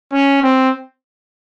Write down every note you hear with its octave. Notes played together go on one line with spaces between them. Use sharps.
C#4
C4